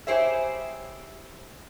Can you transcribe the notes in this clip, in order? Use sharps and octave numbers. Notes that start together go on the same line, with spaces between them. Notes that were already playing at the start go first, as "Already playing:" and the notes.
E4 G4 G#4 C5 C#5 E5